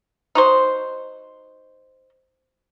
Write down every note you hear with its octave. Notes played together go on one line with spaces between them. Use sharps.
D#4 F#4 C5